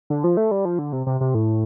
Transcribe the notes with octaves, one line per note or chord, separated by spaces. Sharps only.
D3
F3
A3
G3
F3
D3
C3
C3
C3
A2